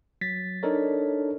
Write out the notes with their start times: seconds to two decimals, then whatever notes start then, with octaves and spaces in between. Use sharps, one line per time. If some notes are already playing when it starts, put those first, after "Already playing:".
0.21 F#3 A6 B6
0.63 D4 D#4 A4 A#4 C#5